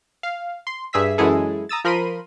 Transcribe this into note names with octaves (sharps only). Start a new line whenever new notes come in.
F5
C6
G2 G#4 E5 E6 B6
F#2 E3 G#3 E4 G#4 A4
A#5 D#6 E6 A6
F3 A#4 B5 C6 D#7